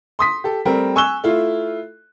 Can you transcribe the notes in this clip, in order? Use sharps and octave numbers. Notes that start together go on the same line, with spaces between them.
C6 D#6 B6
G4 A4
G3 A3 C4 A#4
G#5 C#6 E6 F#6 E7 G7
A3 E4 F4